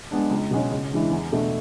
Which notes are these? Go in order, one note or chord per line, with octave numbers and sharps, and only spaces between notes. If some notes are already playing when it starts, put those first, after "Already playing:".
G#3 B3 D4
C#2
B2 G#3 C#4
C#3
E3 G#3 D4
E2
B2 A3 D4